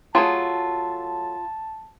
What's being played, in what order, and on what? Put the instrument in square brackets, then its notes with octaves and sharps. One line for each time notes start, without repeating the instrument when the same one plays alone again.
[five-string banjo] F#3 A3 G#4 [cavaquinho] F4 [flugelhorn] A5